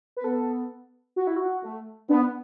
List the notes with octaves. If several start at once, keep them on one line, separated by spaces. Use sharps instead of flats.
B4
B3 A4
F#4
E4
F#4
A3
B3 D4